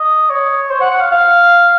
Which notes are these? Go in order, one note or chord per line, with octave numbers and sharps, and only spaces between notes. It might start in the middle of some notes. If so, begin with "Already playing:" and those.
Already playing: D#5
C#5
C5
F#5
F#5
F5
F5